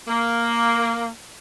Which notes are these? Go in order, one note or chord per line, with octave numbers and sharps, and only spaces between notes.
A#3